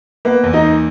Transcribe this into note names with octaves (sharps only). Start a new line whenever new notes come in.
A#3 B3 B4
E2
D#4 D#5
A#3